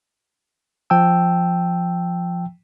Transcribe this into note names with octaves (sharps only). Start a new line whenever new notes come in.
F3 G5 A5 E6